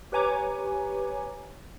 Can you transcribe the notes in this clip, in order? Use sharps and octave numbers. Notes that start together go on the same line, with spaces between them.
G4 B4 C#5 G#5 A#5 D6